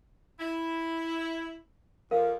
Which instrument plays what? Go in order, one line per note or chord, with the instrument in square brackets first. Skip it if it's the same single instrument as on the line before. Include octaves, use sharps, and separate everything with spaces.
[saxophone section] E4
[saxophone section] F2 [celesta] A#4 F5